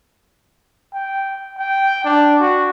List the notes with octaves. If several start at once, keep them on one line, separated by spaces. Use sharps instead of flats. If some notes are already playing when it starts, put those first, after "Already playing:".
G5
G5
D4
F#4